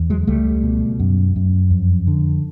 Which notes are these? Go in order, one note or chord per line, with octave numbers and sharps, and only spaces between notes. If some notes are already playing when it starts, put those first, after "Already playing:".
Already playing: E2
F#3 G#3
C#2 G3 A3
B2
F#2
F#2
F2
D3